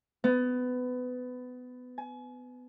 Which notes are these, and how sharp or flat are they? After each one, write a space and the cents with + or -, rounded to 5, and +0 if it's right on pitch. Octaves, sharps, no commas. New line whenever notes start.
B3 +20
G#5 +35